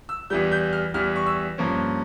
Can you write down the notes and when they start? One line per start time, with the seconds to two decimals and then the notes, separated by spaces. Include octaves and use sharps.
0.09 E6
0.30 E2 E3 G3 G6
0.52 G6
0.73 F6
0.94 E2 E3 G3 F6
1.16 C#6
1.26 E6
1.58 G2 F3 A#3 C#4